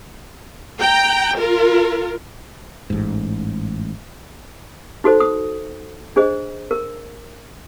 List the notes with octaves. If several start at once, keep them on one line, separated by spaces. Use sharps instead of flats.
G5 A#5
F4 A#4
A1 G#2
D#4 F#4 A4 C5
D#6
D4 G#4 C5 D#5
A#4